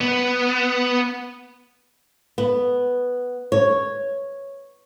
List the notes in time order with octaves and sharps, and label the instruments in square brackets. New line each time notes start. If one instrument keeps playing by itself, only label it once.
[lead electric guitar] B3
[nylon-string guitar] B3
C#5